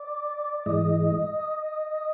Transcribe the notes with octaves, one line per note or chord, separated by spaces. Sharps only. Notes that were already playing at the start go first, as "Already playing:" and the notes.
Already playing: D5
G#2 E3 G#3 D#5